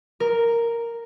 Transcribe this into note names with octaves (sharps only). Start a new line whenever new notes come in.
A#4